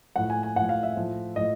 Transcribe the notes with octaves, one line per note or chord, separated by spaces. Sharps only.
A2 F3 F#5
G#5
G#5
A2 F3 F#5
F5
E5
A2 F3
A2 F3 D#5